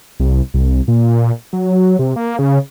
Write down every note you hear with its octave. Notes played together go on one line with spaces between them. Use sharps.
C2
C2
A#2
F#3
C3
A#3
C#3